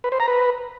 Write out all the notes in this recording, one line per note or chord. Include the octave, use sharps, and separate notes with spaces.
B4
C5
A#5
B4